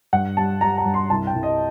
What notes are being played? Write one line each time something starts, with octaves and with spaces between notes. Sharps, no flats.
G2 F#5
G3 A5
G3 A#5
A#5
G2
C6
C2 A5
G5
C2
D#5